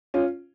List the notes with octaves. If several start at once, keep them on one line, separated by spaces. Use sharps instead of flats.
C#4 F4